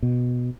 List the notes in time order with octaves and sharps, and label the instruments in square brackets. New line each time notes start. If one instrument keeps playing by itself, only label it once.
[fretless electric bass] B2